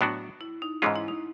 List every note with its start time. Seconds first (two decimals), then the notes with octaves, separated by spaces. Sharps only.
0.01 A2 F#3 B3 D4 F#4
0.41 E4
0.62 D#4
0.82 G#2 E3 G#3 C#4 F4
0.96 E4
1.08 D#4